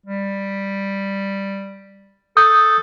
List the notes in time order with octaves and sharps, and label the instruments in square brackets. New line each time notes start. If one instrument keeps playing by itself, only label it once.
[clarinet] G3
[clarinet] A4 [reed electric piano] D#6 G6